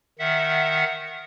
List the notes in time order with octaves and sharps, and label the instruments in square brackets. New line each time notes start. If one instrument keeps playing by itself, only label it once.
[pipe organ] D#3 E5 F#5